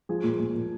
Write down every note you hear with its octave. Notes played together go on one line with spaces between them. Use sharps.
F3 G#4
A#2
A#2
A#2